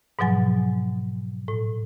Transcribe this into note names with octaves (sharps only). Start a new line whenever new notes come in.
G#2 B2 F3 F#3 G#5
A2